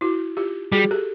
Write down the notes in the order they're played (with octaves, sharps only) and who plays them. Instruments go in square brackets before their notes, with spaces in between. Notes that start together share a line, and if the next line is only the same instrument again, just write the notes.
[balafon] E4 F#4
F4 G4
[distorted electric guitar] G3 [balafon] F#4 G#4
[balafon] G4 A4